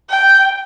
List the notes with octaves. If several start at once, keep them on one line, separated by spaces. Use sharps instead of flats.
G5